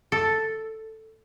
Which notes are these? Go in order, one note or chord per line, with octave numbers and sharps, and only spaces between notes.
A4